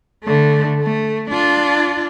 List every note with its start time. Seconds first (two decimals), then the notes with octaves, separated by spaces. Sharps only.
0.23 D3 A3
0.83 A3
1.30 D4 F4